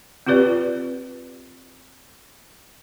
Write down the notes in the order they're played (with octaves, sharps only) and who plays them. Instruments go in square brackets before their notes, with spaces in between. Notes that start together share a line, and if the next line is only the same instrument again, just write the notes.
[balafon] C4 F4 G4 B4 D5